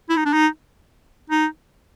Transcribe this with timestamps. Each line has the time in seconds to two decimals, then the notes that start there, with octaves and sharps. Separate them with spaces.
0.09 E4
0.16 D#4
0.25 D4
0.33 D#4
1.30 D#4